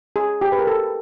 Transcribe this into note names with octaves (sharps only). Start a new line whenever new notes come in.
G#4
G4
B4
A#4
A4